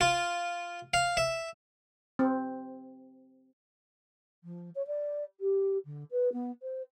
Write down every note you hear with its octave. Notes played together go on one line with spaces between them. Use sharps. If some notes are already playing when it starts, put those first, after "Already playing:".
F4
F5
E5
C4
F3
C#5
D5
G4
D3
B4
B3
C5